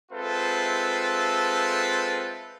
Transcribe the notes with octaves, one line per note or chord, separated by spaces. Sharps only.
G#3 C4 F4 A4 B4 E5